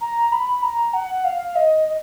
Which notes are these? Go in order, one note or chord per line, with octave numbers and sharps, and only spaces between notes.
A#5
B5
A#5
F#5
F5
D#5
D#5